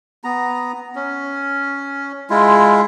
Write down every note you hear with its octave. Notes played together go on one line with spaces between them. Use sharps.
B3 A#5
C#4
G#3 E4 F4